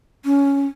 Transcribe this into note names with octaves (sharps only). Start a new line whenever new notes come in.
C#4